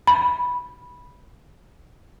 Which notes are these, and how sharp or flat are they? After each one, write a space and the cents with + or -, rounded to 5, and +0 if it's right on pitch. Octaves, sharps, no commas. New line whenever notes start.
B5 -10